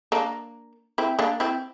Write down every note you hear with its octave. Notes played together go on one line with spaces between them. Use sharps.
A#3 D4
C4 E4
A#3 D4
C4 E4